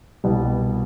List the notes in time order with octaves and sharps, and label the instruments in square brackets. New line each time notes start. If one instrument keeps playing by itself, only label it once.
[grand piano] C2 B2 G3